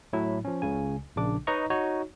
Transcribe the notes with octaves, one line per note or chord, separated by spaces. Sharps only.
A2 F#3 E4
F3 C#4
C#2 C#3 G#5
A#1 C#3 D4 D6
D#4 B4 C#5 D#5 A#5 C#6
D#4 F#4 C#5